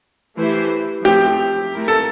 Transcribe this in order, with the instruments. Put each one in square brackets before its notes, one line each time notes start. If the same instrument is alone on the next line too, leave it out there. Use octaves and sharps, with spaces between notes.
[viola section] E3 A3 E4 G4 C5
[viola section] F3 A3 C4 [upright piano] G4
[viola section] A3 E4 A#4
[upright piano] A4